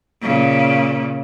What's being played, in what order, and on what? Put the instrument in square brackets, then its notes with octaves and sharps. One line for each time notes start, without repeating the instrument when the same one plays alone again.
[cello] A#2 C#3